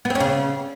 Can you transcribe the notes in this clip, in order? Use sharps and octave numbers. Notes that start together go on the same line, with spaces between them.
B3
C4
C#4
C#3